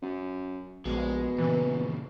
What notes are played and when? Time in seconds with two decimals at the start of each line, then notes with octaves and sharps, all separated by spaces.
0.02 F#2
0.85 A#1 B2 G#3
1.38 A#2 C#3 E3